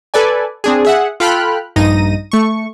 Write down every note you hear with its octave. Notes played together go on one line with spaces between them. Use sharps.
A4 B4 D5 G#5
C4 D4 G#4
G#4 E5 F#5
F4 A4 G5 B5 F6 F#6
A#1 G2 D#4 A#6 D#7
A3 C#6